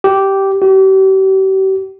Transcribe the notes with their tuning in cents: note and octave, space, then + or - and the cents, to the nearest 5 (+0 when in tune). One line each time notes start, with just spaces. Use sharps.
G4 -10
G4 -40